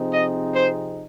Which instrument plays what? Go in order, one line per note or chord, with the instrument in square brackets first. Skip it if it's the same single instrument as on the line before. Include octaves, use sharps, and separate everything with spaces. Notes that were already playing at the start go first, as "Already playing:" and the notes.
Already playing: [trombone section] C3 F3 C4 D#4 G#4
[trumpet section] D#5
C5